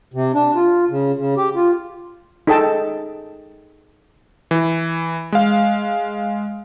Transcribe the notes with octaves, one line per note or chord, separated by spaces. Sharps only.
C3
D4
F4
C#3
C#3
G4
F4
D#4 G#4 A4 D#5 G5 A5
E3
G#3 F5